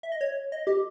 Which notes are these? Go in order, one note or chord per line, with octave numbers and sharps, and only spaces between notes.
E5
D#5
C#5
D#5
G4